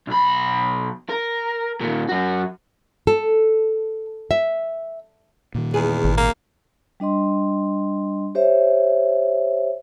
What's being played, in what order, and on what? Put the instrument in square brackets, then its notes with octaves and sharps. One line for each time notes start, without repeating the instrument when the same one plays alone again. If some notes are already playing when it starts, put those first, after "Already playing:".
[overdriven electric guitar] B1 B5
A#4
A#2 D#3
F#2 F#4
[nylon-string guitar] A4
E5
[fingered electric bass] A#2 D#3
[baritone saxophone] E2 [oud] G#4
[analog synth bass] G#1
[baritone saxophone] A#3
[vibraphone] G3 D4 D#5 C6
G4 C5 C#5 E5